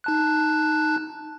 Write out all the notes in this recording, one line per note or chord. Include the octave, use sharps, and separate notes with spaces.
D#4 A5 F#6